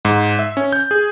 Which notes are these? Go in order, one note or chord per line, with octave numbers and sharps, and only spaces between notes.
G#2
E5
C#4
G6
G#4